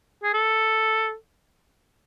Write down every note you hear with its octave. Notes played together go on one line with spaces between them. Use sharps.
G#4
A4